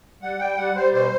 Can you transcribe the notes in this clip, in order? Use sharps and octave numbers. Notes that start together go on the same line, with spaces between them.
G3 F#5
G3 G5
G3 F#5
G3 C5
B2 C5